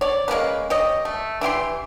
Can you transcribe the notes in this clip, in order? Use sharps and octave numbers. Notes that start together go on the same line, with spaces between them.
C#5 D5
G#3 A#3 C#4 B4
G4 C#5 D#5
A3
E3 E4 G4 C6